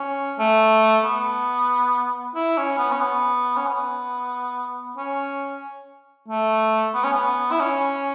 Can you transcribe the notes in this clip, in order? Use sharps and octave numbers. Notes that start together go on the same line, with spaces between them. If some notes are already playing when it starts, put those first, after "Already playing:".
Already playing: C#4
A3
B3
E4
C#4
B3
C#4
B3
C#4
B3
C#4
A3
B3
C#4
B3
E4
C#4